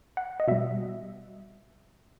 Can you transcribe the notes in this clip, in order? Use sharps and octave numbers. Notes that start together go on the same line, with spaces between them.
F#5
D#5
B2 G3 E5